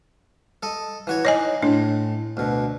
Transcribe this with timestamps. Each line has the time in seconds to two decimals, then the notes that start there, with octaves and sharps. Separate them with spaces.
0.63 A4 D#5
1.07 E3 F#4 C#5
1.25 D#4 C#5 D#5 G#5
1.63 A2 D4
2.37 D2 B2